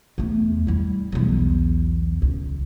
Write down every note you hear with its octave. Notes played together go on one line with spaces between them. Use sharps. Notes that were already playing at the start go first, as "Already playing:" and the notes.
E2 A3
G3 E4
B1 E2
C#2